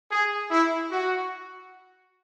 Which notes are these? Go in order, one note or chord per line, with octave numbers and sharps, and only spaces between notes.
G#4
E4
F#4